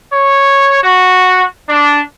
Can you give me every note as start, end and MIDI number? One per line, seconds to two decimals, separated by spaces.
0.13 0.79 73
0.83 1.44 66
1.69 2.00 62